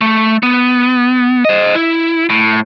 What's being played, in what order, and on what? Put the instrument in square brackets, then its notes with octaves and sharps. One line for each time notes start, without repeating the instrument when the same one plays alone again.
[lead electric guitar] A3
B3
C5 D#5
E4
A2